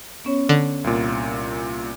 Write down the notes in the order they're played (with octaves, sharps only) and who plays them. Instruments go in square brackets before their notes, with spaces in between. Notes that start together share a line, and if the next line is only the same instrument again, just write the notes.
[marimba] B3 C#4 C#5
[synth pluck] D3
[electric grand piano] C2 A#2